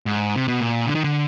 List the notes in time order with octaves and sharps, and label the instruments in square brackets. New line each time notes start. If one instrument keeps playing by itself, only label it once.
[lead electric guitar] G#2
C3
B2
A#2
D3
D#3
D3